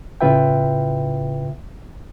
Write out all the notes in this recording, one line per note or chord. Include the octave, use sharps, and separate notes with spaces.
A2 C#3 F4 B4 E5 G5